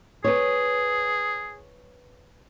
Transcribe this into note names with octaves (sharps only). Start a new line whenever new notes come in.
G#4 B4 C#5